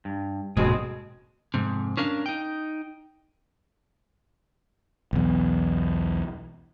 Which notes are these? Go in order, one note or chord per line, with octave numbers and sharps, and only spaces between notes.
G2
D#1 D2 G#2 B2 D#3 G#3 C4 G#4
F2 G#2 C3
C#4 D4 A#4 F5
D#4 G5
B1 E2